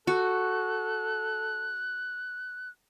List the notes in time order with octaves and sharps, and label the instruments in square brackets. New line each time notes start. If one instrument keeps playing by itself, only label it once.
[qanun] F#4 [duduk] A4 [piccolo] F#6